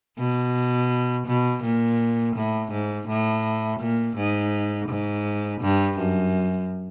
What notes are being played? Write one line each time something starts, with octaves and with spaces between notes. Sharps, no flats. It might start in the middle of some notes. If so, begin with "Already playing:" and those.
B2
B2
A#2
A2
G#2
A2
A#2
G#2
G#2
G2
F#2